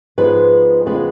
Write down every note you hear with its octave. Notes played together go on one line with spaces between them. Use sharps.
G#2 F3 G#3 B3 B4
F2 C#3 F3 G#3 B3 B4